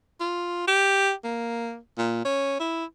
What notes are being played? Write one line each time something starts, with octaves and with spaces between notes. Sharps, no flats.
F4
G4
A#3
A#2
C#4
E4